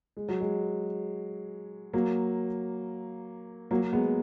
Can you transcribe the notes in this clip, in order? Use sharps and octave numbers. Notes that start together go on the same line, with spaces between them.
G#3
F#3
G#3
F#3 A#3
F#3 A#3
G#3 B3